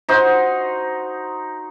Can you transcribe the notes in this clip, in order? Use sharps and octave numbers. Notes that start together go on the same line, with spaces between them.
D#4 F#4 C5